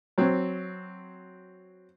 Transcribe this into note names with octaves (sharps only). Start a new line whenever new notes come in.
F#3 C4